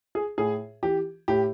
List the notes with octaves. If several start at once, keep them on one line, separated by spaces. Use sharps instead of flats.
G#4
A2 G#4
E3 G4
A2 G4